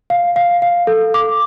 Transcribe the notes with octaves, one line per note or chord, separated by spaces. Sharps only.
F5
F5
F5
A4
D6